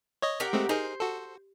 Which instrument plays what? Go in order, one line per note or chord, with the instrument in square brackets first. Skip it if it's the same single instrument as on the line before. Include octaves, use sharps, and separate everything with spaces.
[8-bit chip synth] C#5 D#5
[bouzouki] G4 A#4 F#5
[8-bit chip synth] G#3 A3 C4
[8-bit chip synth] D#4 G#4 A#4 [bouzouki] C5
[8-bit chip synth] F#4 A4